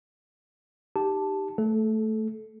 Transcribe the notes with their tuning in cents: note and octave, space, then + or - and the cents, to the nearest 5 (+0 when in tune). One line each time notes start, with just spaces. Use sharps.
D#4 -5 G4 +0 A5 +0
A3 +0 A4 -25